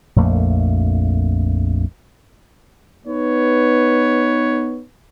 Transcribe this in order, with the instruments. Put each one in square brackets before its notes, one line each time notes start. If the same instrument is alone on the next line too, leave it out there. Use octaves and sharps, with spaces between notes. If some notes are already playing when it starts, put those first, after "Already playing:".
[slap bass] A#1 F2 A3 A#3
[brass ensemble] B3 D#4 B4 C#5